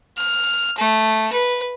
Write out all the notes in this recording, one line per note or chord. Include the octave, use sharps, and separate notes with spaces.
F6
A3
B4